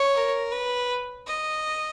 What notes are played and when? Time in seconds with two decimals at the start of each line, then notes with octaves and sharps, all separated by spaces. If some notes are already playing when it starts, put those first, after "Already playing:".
Already playing: C#5
0.15 A#4
0.52 B4
1.27 D#5